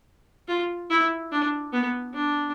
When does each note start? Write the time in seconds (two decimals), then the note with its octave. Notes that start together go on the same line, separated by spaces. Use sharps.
0.48 F4
0.90 E4
1.32 D4
1.73 B3
2.14 D4